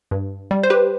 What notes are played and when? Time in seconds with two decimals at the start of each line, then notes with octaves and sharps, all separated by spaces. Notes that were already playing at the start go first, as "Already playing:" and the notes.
0.11 G2
0.51 G3
0.63 C5
0.70 G4 B4